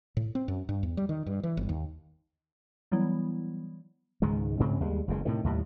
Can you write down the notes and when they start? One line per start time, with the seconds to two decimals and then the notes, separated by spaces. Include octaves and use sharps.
0.17 A2
0.35 C4
0.48 F#2
0.69 G2
0.83 E2
0.97 G3
1.09 D#3
1.26 G2
1.43 E3
1.57 G1
1.69 D#2
2.92 E3 F#3 G3 B3 E4
4.22 C#2 G#2 D#3 G#3
4.60 G#2 C#3 C4
4.80 D#2 G3 G#3
5.08 F#1 E2 G#3
5.25 A2 C3 D#3
5.44 D#2 A2 G3